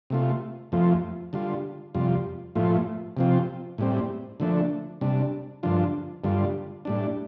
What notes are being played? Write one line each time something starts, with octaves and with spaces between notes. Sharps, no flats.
C3 A3 F4
F2 F3 A3 F4
D3 G3 F4
F2 C3 G3 F4
A2 F3 A3 F4
C3 F3 C4 F4
A2 G3 C4
D3 F3 A3 D4
C3 G3 D4
G2 D3 F3 D4 F4
G2 D3 G3 F4
A2 G3 D4